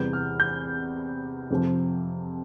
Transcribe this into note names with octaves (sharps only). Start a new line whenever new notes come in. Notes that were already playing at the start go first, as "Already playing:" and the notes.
Already playing: E2 C3 E3 G3 G6
F6
G6
F2 C3 F3